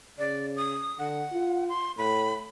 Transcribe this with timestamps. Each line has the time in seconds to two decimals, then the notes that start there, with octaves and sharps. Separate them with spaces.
0.19 C#3 D5
0.56 D#6
0.99 D3 F#5
1.33 F4
1.69 C6
1.98 A2 B5